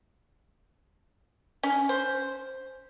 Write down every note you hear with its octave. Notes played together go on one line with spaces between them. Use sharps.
C#4
C5